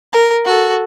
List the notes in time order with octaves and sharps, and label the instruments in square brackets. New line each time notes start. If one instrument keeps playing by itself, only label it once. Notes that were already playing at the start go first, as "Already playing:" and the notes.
[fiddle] A#4
F#4 A4